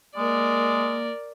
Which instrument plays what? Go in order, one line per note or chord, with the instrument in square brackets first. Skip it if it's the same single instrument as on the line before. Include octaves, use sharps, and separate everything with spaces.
[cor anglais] G#3 [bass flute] A#3 [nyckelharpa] A#4 D5